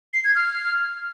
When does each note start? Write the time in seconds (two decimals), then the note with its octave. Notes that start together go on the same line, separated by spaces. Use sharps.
0.13 C7
0.24 G#6
0.35 F6